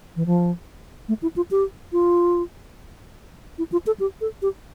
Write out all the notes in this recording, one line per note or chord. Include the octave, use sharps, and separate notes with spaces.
E3
F3
A3
E4
F4
G4
F4
E4
F4
A4
G4
A4
G4